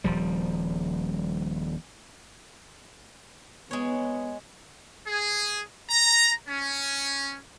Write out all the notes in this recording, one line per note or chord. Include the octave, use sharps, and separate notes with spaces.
D#1 F3 G3
G#3 B3 C#5
G#4
A#5
C#4